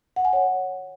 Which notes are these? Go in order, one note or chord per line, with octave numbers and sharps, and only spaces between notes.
F#5
G#5
C#5